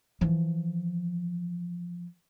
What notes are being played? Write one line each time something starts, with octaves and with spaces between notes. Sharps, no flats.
E3 F3